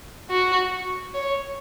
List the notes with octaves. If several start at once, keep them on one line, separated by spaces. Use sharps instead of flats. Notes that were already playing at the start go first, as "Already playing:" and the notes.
F#4
C#5